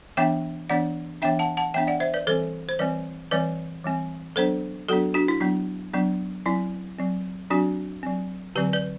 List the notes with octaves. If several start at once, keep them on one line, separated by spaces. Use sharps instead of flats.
E3 B3 D4 E5 G5
E3 B3 D4 D5 F#5
E3 B3 D4 E5 G5
F#5 A5
F#5 A5
E3 B3 D4 E5 G5
D5 F#5
C5 E5
B4 D5
E3 G3 C4 A4 C5
C5
E3 G3 C4 B4 D5
E3 G3 C4 B4 D5
E3 G3 C4
F#3 B3 D4 A4 C5
F#3 B3 D4 F#4 A4
D4 F#4
E4
F#3 B3 D4
F#3 B3 D4
F#3 C4 E4
F#3 C4
F#3 C4 D4 F#4
F#3 C4
D3 F#3 C4 G4 B4
B4 D5